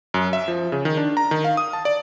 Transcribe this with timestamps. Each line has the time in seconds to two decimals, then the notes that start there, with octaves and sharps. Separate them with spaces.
0.14 F#2
0.33 E5
0.48 F3
0.72 C#3
0.85 D#3
0.97 D4
1.17 A#5
1.31 D#3
1.44 F5
1.57 D#6
1.73 A5
1.85 D5